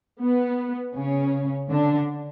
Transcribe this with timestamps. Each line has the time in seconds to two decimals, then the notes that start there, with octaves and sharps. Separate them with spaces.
0.21 B3
0.95 C#3 C#4
1.69 D3 D4